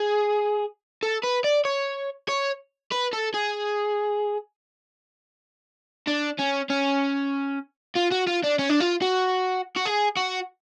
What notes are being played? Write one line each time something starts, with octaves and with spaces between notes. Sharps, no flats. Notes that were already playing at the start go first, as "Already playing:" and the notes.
Already playing: G#4
A4
B4
D5
C#5
C#5
B4
A4
G#4
D4
C#4
C#4
F4
F#4
F4
D4
C#4
D4
F4
F#4
F#4
G#4
F#4